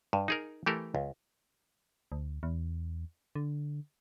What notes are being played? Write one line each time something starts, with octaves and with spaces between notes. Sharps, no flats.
G2
D#4 G#4 A#4
E3 A3 G4 A4 A#4
C#2
D2
E2
D3